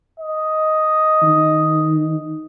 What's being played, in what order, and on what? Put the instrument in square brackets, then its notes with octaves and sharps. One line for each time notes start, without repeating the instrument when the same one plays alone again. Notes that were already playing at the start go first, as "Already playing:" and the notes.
[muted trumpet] D#5
[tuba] D#3